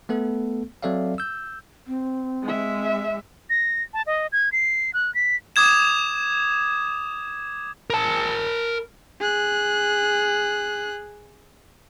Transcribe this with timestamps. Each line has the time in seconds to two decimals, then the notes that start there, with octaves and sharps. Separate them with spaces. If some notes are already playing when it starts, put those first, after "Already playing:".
0.09 A3 B3 A4
0.83 F#3 C4 A4 D5 E5 F5
1.18 E6 G6
1.87 C4
2.43 G#3 E5
3.50 A#6
3.94 A5
4.07 D#5
4.32 G#6
4.52 C7
4.94 F#6
5.15 B6
5.56 D6 D#6 G#6 E7
7.90 A#4 A5
9.20 G#4 F#6